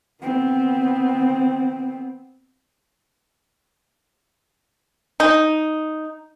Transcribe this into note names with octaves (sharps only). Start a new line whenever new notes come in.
B3 C4
D#4